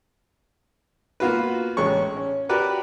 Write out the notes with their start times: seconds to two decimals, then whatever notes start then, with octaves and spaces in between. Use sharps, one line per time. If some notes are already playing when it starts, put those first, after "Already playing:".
1.20 A#3 B3 F4 F#4 B4
1.77 A1 G#3 C#4 C#6
2.17 C#4
2.49 F#4 G4 A#4 B4 D5 F#5